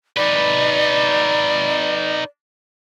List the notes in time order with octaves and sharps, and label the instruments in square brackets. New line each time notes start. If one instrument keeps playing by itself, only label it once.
[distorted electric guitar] D#4 B4 [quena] D5